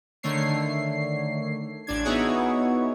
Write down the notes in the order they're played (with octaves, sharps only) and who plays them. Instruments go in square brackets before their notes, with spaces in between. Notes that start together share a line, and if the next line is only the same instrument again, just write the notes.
[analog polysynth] D3 D#3 A3 C#5 C7
A1 D4 G#6
B3 D#4 E4 F#4 G#4 C#5